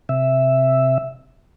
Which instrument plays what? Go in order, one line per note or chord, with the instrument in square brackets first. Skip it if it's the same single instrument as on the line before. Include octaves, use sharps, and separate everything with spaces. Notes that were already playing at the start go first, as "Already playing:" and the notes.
[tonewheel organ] C3 E5